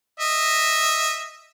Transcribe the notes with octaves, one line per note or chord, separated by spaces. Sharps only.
D#5 E5